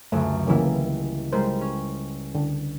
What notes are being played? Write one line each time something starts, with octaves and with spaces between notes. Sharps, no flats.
C#2 F#2 D3 A3
C#3 E3 G3 A#3 E4
G3 G#3 A#4 C5
C#4
D3